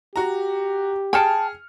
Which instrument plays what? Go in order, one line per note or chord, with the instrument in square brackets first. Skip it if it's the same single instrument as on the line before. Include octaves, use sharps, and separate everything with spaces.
[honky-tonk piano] F#4 A#5 [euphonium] G4
[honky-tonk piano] G#4 F6 C#7 [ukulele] G5 A5